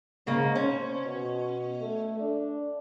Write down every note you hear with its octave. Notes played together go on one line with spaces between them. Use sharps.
G#2 C#3 A#3
C#4 C5
B2
A3
D4